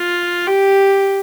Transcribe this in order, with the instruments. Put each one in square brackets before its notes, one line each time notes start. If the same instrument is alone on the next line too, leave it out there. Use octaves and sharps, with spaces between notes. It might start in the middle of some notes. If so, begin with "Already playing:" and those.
Already playing: [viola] F4
G4